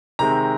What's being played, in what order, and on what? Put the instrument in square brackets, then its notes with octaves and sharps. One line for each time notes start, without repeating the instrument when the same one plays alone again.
[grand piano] C3 D#3 G#3 C4 A#5